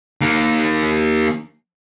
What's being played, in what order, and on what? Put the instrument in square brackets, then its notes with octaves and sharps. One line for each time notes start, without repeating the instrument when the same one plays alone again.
[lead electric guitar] D#3 A#3